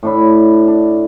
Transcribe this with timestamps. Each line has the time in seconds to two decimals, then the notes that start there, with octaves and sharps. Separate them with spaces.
0.03 A2 D4 B5
0.67 D4